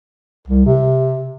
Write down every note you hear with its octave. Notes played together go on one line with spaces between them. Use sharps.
C2
C3